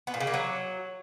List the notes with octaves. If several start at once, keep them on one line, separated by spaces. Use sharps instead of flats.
B3
A#2
C#3
A#3
F#3